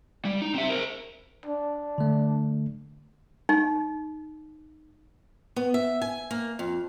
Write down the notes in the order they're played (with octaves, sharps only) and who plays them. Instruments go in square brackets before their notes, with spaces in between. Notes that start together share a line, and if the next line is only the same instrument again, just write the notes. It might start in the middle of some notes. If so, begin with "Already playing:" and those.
[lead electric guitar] G3
D#4
C4 E5
A#4 C5
[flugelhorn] D4
[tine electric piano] D3 A3
[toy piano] D#4
[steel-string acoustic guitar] B3
E5
G#5
A#3
F2